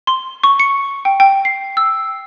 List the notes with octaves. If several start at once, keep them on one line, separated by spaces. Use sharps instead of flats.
C6
C#6
C#7
G5
G5
C7
E6